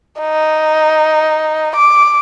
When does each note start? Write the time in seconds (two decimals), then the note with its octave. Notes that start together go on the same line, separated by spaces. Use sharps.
0.20 D#4
1.76 D6